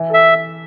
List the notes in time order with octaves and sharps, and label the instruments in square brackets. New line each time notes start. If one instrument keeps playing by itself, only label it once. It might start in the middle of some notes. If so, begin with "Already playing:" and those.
Already playing: [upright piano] E3
[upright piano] A4 [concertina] E5